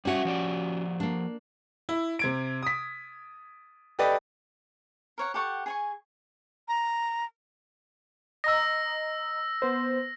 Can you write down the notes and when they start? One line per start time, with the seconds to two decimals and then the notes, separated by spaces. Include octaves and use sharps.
0.05 G3 C#4 F#4 E5
0.25 F3 G4 D5
1.00 A#3 D4
1.89 E4
2.19 C3 G#6 D7
2.63 D#6 B6
3.99 G4 A4 B4 D5 D#5
5.18 A#4 C#5 F#5
5.34 G4 A4 F#5 C#6
5.66 G#4 G#5 C#6
6.68 A#5
8.44 D#5 A#5 E6 A#6
9.62 B3 C5